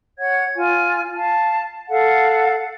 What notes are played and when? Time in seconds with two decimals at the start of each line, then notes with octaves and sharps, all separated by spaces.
0.18 C#5 F#5 G#6
0.55 F4 G#5
1.14 F5 A5
1.88 A4 F5 F#5